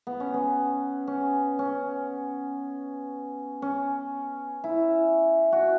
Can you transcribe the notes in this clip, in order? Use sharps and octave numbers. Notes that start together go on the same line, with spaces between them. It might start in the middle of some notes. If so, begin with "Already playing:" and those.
B3
C#4
B3
C#4
C#4
C#4
E4
F#4